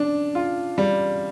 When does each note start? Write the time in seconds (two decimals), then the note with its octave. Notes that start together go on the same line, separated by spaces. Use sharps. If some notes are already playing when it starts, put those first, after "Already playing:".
Already playing: D4
0.35 F4
0.78 G3